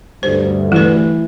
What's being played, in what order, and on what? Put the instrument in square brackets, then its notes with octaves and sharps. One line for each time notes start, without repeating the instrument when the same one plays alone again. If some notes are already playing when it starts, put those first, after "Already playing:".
[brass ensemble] D2 G2 [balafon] C5
[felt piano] E3 [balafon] A3 B4